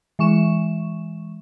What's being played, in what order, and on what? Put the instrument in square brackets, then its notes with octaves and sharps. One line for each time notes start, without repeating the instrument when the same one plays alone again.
[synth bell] E3 G#3 C#6 E7